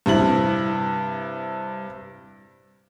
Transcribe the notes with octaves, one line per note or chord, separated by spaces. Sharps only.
G2 C3 E4 F#7